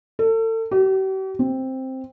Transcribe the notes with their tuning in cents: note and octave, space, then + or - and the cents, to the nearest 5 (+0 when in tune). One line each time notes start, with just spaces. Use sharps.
A4 +35
G4 -45
C4 +5